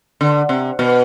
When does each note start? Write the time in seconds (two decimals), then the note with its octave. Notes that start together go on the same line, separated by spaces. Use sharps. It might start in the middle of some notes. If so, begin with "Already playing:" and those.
0.21 D3
0.49 C3
0.79 B2